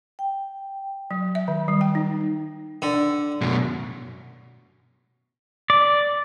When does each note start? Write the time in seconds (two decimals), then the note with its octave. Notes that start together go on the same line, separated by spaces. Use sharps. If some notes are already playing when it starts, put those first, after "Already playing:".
0.19 G5
1.11 F#3
1.35 E5
1.48 D#3
1.68 G3
1.81 G5
1.95 D#4
2.82 D3
3.41 F#2 B2
5.70 D5